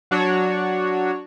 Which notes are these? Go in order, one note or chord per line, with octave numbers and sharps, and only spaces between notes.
F#3 D4 F#4 C#5